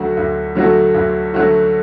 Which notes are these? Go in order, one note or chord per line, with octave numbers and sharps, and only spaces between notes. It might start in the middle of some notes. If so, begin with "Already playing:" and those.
Already playing: D2 D3 F#3 A3 F#4
D2
D3 F#3 A3 F#4
D2
D3 F#3 A3 F#4